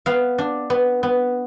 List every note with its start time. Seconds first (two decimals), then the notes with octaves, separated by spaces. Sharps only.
0.06 B3 F5
0.38 D4
0.70 B3
1.03 B3